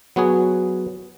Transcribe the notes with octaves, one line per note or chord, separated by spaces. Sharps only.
F#3 B3 F#4 G#4